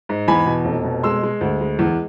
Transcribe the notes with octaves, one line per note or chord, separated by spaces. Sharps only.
G#2
E2 G#5 B5
B2
F1
B2
G#3 C6 E6
G#3
D2
G#3
E2